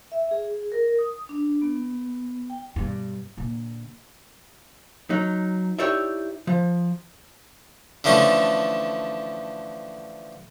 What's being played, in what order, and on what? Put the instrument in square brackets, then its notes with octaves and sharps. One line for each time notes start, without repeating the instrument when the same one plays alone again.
[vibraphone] E5
G#4
A#4
D#6
D4
B3
G5
[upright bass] G2 B2
A#2 D3
[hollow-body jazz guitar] F#3 D#4
D#4 E4 G4 C#5 D5 E5
F3
[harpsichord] D3 E3 F3 A3 C#4